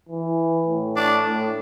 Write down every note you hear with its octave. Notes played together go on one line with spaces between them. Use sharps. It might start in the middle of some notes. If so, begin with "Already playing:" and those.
E3
A2
D4
A2